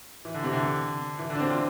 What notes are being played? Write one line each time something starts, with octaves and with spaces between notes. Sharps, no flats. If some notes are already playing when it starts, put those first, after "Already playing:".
E3
D3
C3
D3
E3
D3
D4
C4
F4